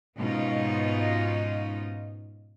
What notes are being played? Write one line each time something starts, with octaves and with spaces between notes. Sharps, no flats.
G#2 B2 B3 C#4 D#4 F4